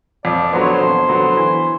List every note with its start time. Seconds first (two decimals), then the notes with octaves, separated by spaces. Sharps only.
0.25 F2 D5
0.53 D3 F#3 B3 C5
0.62 C#5
0.71 C5
0.81 F2
1.09 D3 F#3 B3
1.37 E3